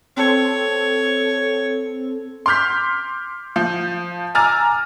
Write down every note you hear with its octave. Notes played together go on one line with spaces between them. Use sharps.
C4 A4 C#5
C6 D6 F6 G6 B6
F3 G6
G#5 A#5 D6 E6 F6 A6